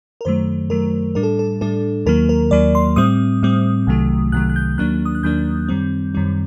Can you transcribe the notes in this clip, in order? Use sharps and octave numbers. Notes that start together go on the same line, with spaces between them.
A#4
F#2 D#3 F#3 A3 C5
F#2 D#3 F#3 A3 A#4
A2 G3 D4 A#4
A4
A4
A2 G3 D4 A4
D#2 D#3 F#3 A#3 A#4
A#4
D#2 D#3 F#3 A#3 D5
C6
A2 G3 C4 D#6
A2 G3 C4
C2 C3 D#3 F#3 A3
C2 C3 D#3 F#3 A3 F#6
F#6
G6
D#2 D#3 F#3 A#3 D4 F#6
D#6
F#6
D#2 D#3 F#3 A#3 D4 G6
F#2 D#3 G3 C4
F#2 D#3 G3 C4